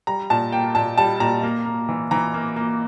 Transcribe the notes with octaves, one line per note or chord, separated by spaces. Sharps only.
G3 A#5
A#2 A5
A#3 G5
A#2 A5
G3 A5
A#2 A#5
A#3
A#3
E3
E3 A#5
A#3
A#3